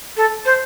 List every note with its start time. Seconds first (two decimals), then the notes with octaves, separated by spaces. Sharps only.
0.17 A4
0.45 C5